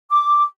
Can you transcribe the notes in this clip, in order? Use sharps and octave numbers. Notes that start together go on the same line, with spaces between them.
D6